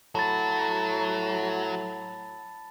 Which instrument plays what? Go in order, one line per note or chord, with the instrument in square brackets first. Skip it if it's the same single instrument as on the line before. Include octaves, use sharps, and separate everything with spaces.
[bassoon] A2 [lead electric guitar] F#3 [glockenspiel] A5 B5 A6